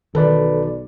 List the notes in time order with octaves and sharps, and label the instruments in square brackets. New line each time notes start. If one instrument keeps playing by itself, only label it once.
[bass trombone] B1 [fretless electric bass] D#3 E3 [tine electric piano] A4 B4 D5